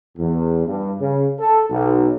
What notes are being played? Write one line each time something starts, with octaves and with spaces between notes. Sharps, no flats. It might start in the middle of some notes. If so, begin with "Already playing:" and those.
E2
G2
C#3
A4
B1